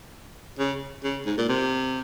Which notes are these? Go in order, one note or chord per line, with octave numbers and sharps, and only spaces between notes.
C#3
C#3
G#2
A#2
C3